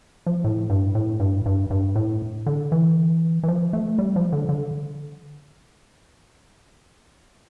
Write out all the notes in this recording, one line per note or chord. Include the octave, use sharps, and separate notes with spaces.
F3
A2
G2
A2
G2
G2
G2
A2
D3
E3
E3
F3
A3
G3
F3
D3
D3